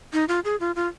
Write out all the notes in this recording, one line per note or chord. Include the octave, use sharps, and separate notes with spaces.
D#4
F4
G#4
F4
F4